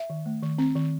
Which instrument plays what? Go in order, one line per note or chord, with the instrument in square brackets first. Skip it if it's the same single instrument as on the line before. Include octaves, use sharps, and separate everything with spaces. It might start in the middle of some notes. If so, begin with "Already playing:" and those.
Already playing: [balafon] E5
D#3
A3
D#3
C4
D#3